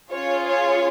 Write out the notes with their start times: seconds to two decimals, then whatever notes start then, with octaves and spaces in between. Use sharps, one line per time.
0.11 C#4 F4 G#4 C#5
0.47 C#5